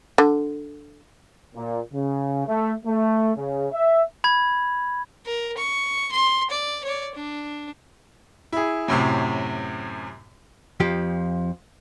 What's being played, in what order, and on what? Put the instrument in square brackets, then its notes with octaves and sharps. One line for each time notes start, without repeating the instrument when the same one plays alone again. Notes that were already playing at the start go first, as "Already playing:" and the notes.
[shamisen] D3
[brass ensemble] A#2
C#3
A3
A3
C#3
E5
[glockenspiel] B5 G#6
[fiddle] A#4
C#6
C6
D5
C#5 D5
D4
[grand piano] E4 G#4
F#2 A2 C3
[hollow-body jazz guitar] F2 F3 G4